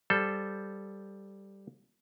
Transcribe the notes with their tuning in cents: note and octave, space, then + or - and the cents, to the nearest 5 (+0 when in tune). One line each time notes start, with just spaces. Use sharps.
G3 +0 A4 -5 C5 +0